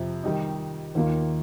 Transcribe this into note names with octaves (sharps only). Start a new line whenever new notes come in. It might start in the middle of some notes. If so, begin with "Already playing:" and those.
Already playing: F2 C3 F3
D#3 G3 D#4
D#2 D#3 A#3 F4